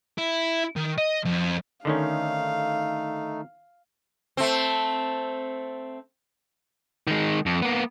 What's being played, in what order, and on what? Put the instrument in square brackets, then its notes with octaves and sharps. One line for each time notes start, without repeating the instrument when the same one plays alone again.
[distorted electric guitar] E4
D#3
D#5
F2
[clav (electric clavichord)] D3 D#3 C#4 [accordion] A3 D#4 [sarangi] F5
[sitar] A3 C4
[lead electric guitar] D#3 G#3
F2
A#3 B3